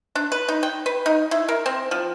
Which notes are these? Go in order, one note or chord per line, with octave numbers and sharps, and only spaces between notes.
D4
B4
D#4
G5
B4
D#4
E4
A#4
C4
F3